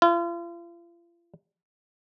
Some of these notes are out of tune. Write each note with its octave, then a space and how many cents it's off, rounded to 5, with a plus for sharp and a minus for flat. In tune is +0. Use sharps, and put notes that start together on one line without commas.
F4 -40